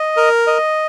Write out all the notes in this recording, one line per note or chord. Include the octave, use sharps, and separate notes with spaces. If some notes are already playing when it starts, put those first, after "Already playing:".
Already playing: D#5
A#4
D#5